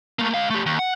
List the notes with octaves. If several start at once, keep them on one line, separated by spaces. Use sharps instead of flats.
A3 A#3
G#3 F5
A3 G4
D#2
F#5